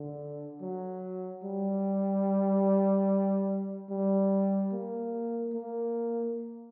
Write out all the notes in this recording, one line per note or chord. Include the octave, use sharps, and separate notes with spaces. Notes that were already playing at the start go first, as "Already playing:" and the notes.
Already playing: D3
F#3
G3
G3
A#3
A#3